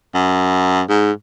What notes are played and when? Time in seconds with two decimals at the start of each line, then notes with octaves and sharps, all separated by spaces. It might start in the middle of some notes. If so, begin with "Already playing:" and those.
0.14 F#2
0.89 G#2